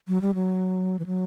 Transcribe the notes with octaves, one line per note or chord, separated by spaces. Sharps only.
F#3
G3
F#3
E3
F#3